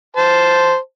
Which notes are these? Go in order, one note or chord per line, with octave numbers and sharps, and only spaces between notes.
C5 A5